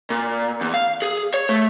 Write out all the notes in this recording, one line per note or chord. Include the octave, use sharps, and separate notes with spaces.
A#2
E2
F5
G#4
C#5
A3